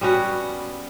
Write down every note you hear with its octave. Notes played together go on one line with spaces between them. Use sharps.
G3 B3 C#4 F#4